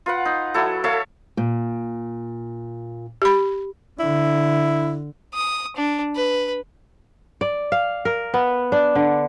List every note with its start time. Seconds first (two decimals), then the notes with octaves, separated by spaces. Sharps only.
0.06 F4 B4 F#5
0.25 D#4
0.54 F#3 E4 A4
0.84 A4 C#5 E5 F5
1.37 A#2
3.22 G4 B5
3.99 D3 E4
5.34 D#6
5.76 D4
6.16 B4
7.41 D5
7.72 F5
8.05 A#4
8.34 B3
8.72 D4
8.95 D3